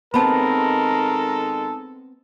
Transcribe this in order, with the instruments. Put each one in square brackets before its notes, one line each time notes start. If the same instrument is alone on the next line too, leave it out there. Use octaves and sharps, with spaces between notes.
[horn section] D#3 G#3 A4 [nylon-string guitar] B3 C4 [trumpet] A#4 [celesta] A5 B5